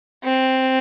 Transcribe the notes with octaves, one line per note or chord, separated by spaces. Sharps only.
C4